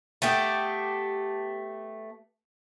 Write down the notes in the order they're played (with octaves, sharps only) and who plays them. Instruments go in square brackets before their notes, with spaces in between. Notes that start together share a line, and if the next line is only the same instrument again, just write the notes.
[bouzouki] A3 B3 G4 A4